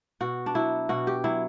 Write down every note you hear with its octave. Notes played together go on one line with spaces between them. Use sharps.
B2 F#4
D4
F#3 E4
B2 F#4
G4
F#3 E4